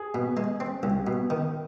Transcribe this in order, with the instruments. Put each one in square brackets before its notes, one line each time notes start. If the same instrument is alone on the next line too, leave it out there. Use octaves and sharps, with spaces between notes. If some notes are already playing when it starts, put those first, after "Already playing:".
Already playing: [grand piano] G#4
[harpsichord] B2
G#3
C4
C2
B2
D#3